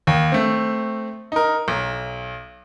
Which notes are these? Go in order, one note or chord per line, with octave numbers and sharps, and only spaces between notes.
D#2
A3 C4
D#4 A#4
B1